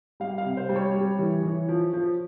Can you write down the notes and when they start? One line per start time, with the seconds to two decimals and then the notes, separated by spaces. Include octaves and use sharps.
0.20 G3 F5
0.38 F5
0.45 C3
0.57 C5
0.69 G3
0.76 C#5
0.94 G3
1.19 E3
1.43 E3
1.69 F3
1.93 F3